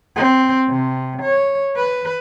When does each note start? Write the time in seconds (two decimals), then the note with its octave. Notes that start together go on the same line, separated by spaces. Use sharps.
0.16 C4
0.69 C3
1.22 C#5
1.76 B4